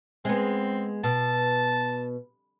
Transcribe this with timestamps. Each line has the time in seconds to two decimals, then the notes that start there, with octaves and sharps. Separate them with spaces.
0.25 G#3 B3 C4
1.04 B2 A5